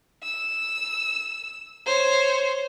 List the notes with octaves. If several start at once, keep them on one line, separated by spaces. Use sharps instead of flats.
E6
C5 C#5